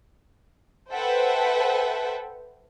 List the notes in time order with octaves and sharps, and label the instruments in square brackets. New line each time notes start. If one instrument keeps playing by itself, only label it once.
[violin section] A4 B4 C5 E5 F#5 G5